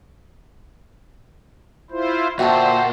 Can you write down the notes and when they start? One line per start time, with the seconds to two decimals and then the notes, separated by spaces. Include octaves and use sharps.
1.91 E4 F4 C5
2.39 A#2 D3 F#4 C5 E5 G5 A5